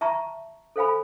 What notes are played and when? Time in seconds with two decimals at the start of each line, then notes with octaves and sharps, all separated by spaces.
0.01 E5 A5 A#5 C#6
0.76 A4 C5 F5 G#5 B5